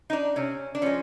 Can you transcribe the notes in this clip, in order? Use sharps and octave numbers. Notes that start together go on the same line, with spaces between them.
D#4
D4
C3 C#4
D4
F3 G#3 C#4